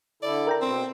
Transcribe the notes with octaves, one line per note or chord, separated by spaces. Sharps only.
D3 E4 A4 D5
A#4 G5 A#5
B2 C4